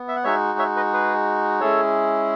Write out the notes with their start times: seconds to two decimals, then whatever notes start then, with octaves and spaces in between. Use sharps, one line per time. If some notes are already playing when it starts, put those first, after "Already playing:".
Already playing: B3
0.08 E5
0.16 F#5
0.24 G#3 D#4 F#4 C#5 E5
0.59 C#5 E5
0.76 B4 D#5
0.93 G#4 B4
1.60 G#3 C#4 E4 G#4 A4 C#5